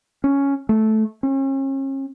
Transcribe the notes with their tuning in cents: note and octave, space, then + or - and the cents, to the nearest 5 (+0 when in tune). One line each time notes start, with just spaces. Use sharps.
C#4 +5
A3 -10
C#4 -40